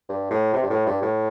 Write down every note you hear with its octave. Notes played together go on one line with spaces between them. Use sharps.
G2
A2
C3
G2
A2
G2
A2